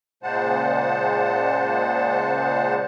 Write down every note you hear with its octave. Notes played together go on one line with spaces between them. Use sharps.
A#2 C#3 G#3 C5 F#5 A5